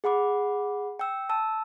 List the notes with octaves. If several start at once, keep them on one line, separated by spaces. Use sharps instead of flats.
G#4 F#5 B5 D6
G5 E6
A5 E6